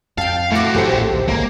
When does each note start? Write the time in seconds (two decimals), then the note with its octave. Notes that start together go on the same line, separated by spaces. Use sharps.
0.18 F2 F5 G5 A5
0.52 A2 A3 F#4 D6
0.75 F#2 A#2 E3 G4 A4 C5
0.92 A#1
1.13 D#2
1.28 G#1 C#2 A#3